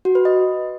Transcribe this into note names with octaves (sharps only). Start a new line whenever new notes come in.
F#4
B4
D#5